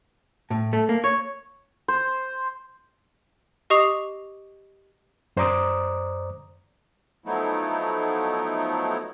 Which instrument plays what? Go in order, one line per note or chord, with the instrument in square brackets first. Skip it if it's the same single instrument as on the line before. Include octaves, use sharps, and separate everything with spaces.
[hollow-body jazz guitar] A2
A3
A#3
C#5
[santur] C5
[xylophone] G4 D#5 C#6 D#6 C7 F7
[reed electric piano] F#2 C5 D5 A#5 D6 D#6
[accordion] F3 F#3 A3 B3 D#4 E4